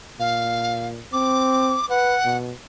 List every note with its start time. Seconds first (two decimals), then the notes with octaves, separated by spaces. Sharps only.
0.20 A#2 F5
1.13 C4 D6
1.90 B4 F#5
2.25 B2